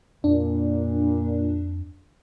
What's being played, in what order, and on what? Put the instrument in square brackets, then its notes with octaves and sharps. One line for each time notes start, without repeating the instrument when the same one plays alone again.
[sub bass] F2 [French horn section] A#2 [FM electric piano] D4